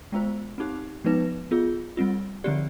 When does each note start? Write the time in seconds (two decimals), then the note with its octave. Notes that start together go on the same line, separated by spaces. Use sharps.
0.12 G#3 B3 F4 C5
0.58 C4 D#4 G4
1.05 F3 G#3 B3 D#4 B4
1.51 B3 F4 G#4
1.97 G3 C4 F4
2.44 D3 F3 C4 G4 D5